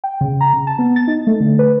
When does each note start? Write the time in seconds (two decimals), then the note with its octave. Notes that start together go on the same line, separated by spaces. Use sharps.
0.04 G5
0.21 C#3
0.41 A#5
0.53 C#3
0.67 A5
0.79 B3
0.96 A6
1.07 D#4
1.27 A3
1.40 D3
1.59 B4